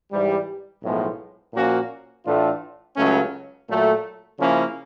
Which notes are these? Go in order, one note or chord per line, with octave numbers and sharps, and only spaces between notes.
G#2 E3 G3
B1 A2 F3 G#3 B3
A#2 F3 A#3 C#4 F#4
A2 E3 A3 D4 F4
C#2 C#3 F#3 A3 C#4
A#2 F#3 A3
C#3 F3 A#3 C#4 E4